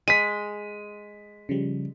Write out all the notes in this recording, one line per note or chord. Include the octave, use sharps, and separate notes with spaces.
G#3 B6 D#7
C#3 F3 G3